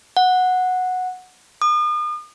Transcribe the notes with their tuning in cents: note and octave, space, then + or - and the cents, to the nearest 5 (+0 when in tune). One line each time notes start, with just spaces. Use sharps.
F#5 -10
D#6 -40